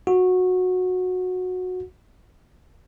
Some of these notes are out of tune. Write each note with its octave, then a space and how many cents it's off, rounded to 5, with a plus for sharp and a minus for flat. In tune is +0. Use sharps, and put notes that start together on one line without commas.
F#4 -15